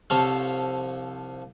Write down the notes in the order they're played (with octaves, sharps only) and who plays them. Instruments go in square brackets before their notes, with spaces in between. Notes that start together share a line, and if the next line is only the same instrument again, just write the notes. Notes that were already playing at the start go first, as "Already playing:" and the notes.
[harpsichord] C2 F3 A4 C#5 F5